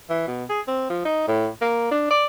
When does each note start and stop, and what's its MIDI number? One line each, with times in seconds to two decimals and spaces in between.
0.10 0.25 52
0.27 0.45 47
0.50 0.61 68
0.67 0.87 60
0.90 1.01 53
1.05 1.23 63
1.28 1.48 45
1.61 1.86 58
1.91 2.08 62
2.10 2.26 74